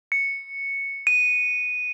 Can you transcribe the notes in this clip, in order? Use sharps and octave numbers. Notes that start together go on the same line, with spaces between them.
C#7
D#7